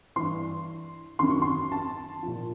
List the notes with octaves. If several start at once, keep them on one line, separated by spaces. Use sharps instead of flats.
G2 E3 C6
F#2 D#3 C6
C#6
C6
A5
A#2 F3